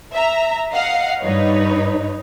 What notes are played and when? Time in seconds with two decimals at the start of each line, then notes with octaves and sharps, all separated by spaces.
0.13 E5 A#5
0.72 D#5 F5 F#5 C7
1.22 G2 D#4 B4 C#5